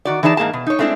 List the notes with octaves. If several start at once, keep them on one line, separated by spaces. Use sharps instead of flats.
D#3 F#4 D5
E3 D#4 G#4 D5 A5
G#2 A#3 G#4 A5
B2
D#4 C#5
G#3 A3 C4 D4 E4